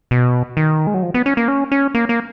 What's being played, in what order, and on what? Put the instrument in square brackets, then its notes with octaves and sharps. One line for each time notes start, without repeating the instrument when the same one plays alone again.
[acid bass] B2
D#3
G#3
F#3
F3
B3
C#4
A#3
C#4
C#4
A#3
A#3